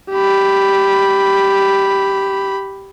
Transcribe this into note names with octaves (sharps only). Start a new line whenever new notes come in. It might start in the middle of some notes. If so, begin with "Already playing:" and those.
G4 B5